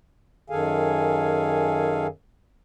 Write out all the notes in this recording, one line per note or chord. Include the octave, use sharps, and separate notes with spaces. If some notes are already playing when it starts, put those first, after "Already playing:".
F#2 D#3 G#4 A4 F5 G#5